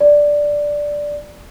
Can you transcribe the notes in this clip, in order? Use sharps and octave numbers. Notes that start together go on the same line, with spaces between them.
D5